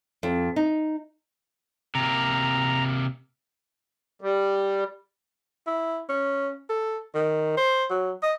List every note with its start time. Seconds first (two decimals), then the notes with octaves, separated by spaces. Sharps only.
0.23 F2
0.56 D#4
1.95 C3 A#3 A#5
4.21 G3
5.67 E4
6.09 C#4
6.70 A4
7.15 D#3
7.57 C5
7.90 F#3
8.23 D#5